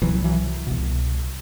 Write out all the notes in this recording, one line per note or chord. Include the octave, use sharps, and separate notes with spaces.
C2 B2 E3 F#3
E3 F#3
C2 B2